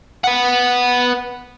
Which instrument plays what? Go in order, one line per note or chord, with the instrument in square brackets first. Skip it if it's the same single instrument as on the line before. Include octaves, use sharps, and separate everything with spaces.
[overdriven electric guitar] B3 F#5